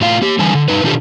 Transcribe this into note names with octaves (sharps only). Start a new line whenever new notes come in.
A2 F4 F5
A#3 G4
D3 E3 G3 G#5
D3
G2 D#4 B4
B2 D#3 D4 F4 G4 A4